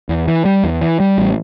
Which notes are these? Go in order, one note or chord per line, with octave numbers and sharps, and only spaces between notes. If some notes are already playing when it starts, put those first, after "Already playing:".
E2
E3
G3
E2
E3
G3
A1